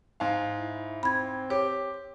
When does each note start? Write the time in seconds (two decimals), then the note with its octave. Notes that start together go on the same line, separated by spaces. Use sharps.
0.20 G#2 F5
0.58 E4
1.03 C4 B5 G#6
1.50 G4 C#5